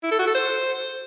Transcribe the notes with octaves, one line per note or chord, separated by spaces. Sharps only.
E4
A4
F#4
A4
C5